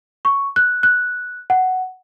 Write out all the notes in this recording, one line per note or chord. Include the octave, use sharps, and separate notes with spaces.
C#6
F#6
F#6
F#5